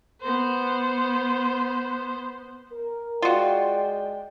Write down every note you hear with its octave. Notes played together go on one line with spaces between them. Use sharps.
B3 C5
A#4
G#3 F4 F#4 D5 G5